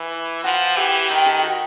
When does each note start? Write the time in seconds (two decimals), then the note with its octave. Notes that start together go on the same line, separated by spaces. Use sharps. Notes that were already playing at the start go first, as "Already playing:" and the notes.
Already playing: E3
0.44 F3 F#4
0.77 E3 G4
1.10 D#3 G4
1.26 G4 A4
1.43 F#4